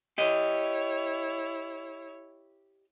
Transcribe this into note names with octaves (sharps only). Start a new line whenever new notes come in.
E4 G4 C#5 D#5